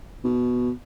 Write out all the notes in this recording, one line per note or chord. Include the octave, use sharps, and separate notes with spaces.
B2